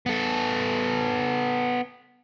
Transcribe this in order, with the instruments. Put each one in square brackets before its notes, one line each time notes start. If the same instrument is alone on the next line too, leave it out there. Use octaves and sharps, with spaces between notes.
[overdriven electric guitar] B3 A4